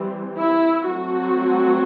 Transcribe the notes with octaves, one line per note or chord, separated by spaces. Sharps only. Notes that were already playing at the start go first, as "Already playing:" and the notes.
Already playing: E3 G3 C4
E4
F#3 A3 C4 F#4